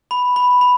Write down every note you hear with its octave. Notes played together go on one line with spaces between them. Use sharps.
B5
B5
B5